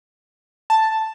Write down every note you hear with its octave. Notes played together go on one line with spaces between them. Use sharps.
A5